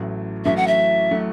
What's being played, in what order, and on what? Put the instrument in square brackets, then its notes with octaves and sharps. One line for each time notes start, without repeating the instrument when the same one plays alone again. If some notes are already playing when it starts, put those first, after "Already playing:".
Already playing: [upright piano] A1 A2 F#3 A3
[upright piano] A1 A2 F#3 A3 [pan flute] E5
[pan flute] F#5
E5
[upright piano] A2 F#3 A3